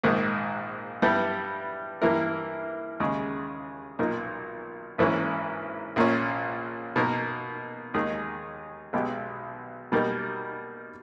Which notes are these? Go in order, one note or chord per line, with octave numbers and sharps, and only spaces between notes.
A#1 G#2 D#3 A#3 D#4
G2 G3 B3 E4 G4
G2 E3 A#3 E4 A#4
D#2 C#3 G#3
B1 A#2 A#3 D#4 A#4
G#1 G#2 E3 A#3 C#4
A#1 A#2 A#3 C#4
B2 A#3 D#4 A#4
D#2 D#3 G#3 D#4 G#4
B1 B2 G#3 B3 G4
B2 G3 A#3 D#4 A#4